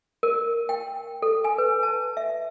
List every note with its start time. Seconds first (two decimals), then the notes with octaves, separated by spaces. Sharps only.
0.23 A#4
0.69 G5
1.22 A4
1.44 G#5
1.58 B4
1.83 A5
2.17 E5